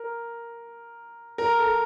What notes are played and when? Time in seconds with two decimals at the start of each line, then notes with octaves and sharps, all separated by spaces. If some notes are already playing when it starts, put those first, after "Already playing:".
Already playing: A#4
1.38 A#4
1.59 A4